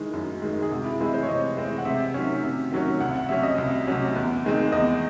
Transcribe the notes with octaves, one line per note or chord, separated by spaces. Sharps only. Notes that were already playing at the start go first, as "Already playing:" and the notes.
Already playing: D#3 G#3 E4
F#2
D#3 G#3
G#4
C3 F#4
E4
E3 G#3 C4 E4
C5
C#5
C3 D#5
E3 G#3 C4
F#5
C3 E5
D#3 F#3 C#4
C3
D#3 F#3 C#4
C2 F#5
F#5
C3 F#3 C#4 E5
D#5
C2
C3 F#3 C#4
E2
D#3 G#3 C4
E2 D#5